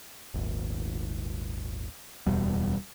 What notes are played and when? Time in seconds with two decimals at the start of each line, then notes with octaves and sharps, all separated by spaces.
0.34 D#1 G#1
2.26 D1 E2 B2 G3